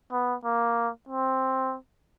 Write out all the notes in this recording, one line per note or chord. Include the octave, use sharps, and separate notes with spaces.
B3
A#3
C4